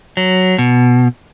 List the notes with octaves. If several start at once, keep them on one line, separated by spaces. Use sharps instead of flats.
F#3
B2